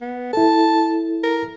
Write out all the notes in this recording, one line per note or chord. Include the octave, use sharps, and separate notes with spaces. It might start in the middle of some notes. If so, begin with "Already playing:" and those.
B3
E4 A4 A5
A#4